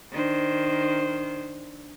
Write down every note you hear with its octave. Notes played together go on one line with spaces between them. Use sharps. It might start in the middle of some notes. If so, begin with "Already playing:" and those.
D#3 D4 C5